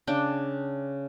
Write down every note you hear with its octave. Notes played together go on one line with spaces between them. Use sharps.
C#3 D4 G5